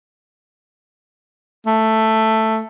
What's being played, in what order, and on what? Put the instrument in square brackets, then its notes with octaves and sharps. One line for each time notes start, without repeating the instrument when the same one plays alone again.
[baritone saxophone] A3